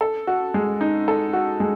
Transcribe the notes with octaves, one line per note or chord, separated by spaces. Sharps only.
A4
F#4
G#3
D#4
A4
F#4
G#3